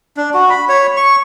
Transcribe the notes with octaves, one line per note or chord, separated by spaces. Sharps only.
D4
F#4
B5
C#5
C#6